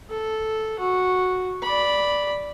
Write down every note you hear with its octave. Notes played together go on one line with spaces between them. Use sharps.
A4
F#4
D5 B5